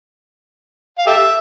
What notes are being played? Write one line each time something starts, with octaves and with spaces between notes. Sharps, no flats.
F5
G4 A4 E5